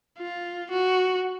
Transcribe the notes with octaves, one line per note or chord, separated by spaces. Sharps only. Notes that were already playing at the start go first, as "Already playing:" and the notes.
F4
F#4